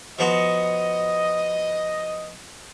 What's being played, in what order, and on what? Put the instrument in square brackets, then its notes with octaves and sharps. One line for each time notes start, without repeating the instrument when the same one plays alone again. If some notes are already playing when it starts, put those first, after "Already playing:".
[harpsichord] F3 B3 F#4 [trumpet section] D#5